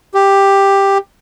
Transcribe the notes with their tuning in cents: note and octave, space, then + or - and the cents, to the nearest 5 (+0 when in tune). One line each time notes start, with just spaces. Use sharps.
G4 +5